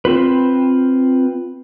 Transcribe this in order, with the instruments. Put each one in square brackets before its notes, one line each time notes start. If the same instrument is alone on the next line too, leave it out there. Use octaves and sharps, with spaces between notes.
[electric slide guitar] C4 F4 B4